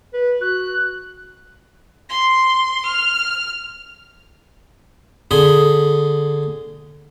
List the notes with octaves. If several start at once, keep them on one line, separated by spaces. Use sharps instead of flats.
B4
F#4 F#6
C6
F6
D3 G#4 B5 C6